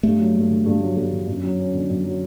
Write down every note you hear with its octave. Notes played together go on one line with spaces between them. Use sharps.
G2 A3
F#3
G2
D3
G2
F#3
G2
D3
F#2
F#3
C#4
D3
F#2
F#3